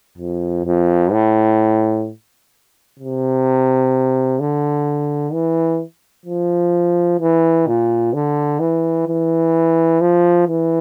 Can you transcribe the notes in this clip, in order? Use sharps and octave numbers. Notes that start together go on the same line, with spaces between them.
F2
F2
A2
C3
D3
E3
F3
E3
A#2
D3
E3
E3
F3
E3